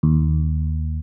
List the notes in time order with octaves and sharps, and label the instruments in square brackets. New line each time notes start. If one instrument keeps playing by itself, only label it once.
[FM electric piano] D#2